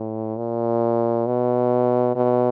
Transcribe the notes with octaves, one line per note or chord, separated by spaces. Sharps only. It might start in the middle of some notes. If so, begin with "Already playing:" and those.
Already playing: A2
A#2
B2
B2